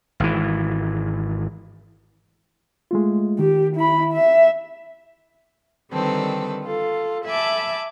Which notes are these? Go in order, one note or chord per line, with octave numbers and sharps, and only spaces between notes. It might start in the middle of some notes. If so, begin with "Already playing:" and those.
G#1 E3
G#3 A3 F4
D#3 G4
E4 B5
E5
D3 D#3 G3 C4 A4 B4
F4 A4
E5 G#5 A5 B5 D6